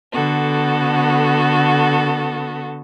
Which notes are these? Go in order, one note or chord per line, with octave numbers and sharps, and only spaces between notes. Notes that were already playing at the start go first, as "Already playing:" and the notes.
D3 B3 F#4 A4